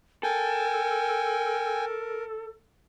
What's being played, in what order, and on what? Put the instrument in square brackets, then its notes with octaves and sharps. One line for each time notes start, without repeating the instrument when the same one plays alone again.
[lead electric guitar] A4 [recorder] A#4 [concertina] G5 G#5